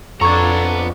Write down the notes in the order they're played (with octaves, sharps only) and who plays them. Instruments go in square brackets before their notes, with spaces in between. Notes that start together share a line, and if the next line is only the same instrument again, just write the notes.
[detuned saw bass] F2 [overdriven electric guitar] B3 A#5 [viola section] D4 F4 A4 [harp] C#6 G#6